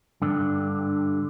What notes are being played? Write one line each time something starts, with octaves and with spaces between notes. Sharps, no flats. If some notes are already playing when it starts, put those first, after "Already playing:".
G2 D3